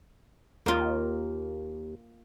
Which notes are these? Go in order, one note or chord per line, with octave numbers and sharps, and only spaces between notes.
D#2 A#3 F4